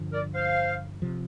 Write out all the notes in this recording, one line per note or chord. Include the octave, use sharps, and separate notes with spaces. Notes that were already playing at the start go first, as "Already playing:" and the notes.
Already playing: G2 D3 F3
A#4 D5
C5 F5
C3 F3